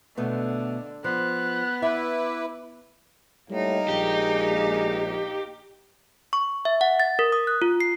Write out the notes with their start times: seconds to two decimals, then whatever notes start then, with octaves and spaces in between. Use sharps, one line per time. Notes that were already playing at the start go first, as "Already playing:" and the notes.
0.17 B2 D3 A3 B3
1.04 F3 B3 F#6
1.82 E4 B4 E5 D6
3.50 A2 G3 A#3 D#4
3.89 A#1 G#3 G4
6.33 C#6
6.65 E5
6.81 F#5
7.00 A6
7.19 A#4
7.32 D#6
7.47 F#6
7.62 F4
7.80 C7